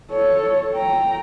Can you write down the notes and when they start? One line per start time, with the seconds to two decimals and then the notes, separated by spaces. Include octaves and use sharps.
0.11 A4 C#5
0.74 G5 A#5